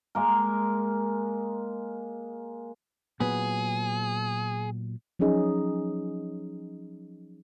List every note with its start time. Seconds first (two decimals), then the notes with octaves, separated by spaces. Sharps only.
0.15 G#3 A#3 A#4
3.20 A#2 F#3 B3 G#4
5.19 F3 F#3 C#4 D#4 G#4 D#5